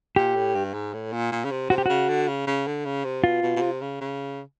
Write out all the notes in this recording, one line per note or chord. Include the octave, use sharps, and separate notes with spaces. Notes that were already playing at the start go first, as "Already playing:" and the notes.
A#2 G4
A2
G2
G#2
A2
A#2
A#2
C#3
C3
C3 F#4
G4
C#3 F#4
D3
C#3
C#3
D3
C#3
C3
B2 F4
B2
B2
C3
C#3
C#3